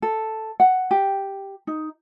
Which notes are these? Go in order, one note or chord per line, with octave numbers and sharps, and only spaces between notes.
A4
F#5
G4
D#4